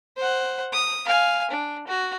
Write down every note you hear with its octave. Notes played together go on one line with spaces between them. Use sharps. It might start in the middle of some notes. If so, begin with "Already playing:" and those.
C5 F#5
D#6
F5 G#5
D4
F#4